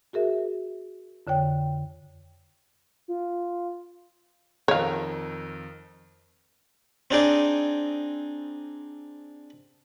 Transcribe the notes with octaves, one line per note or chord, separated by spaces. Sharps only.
F#4 G#4 A#4 E5
F2 D3 C#5 G5
F4
F2 D#3 A#4 C#5 F5
C4 D4 D#4 G#4 D5